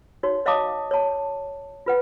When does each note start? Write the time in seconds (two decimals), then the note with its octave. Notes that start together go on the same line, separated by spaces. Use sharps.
0.23 D#4 F#4 C#5
0.46 C#5 D#5 F5 A5 D6 D#6
0.91 C#5 A5
1.86 F4 B4 F#5